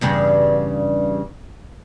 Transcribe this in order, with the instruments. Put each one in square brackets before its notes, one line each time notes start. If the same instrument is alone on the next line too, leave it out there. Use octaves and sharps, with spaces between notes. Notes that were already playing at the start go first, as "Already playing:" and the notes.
[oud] E2 G2 C#3